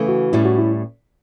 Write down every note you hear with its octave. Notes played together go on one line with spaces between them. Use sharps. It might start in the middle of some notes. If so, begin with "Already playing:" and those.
Already playing: C#3 E3 A3
F#4
A2 G3 C#4 E4
F#4
E4